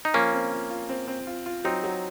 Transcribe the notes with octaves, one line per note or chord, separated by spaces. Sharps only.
D#4
F3 A#3 C#4
C4
F4
F4
C4
C4
F4
F4
F#3 C4 D#4
F#3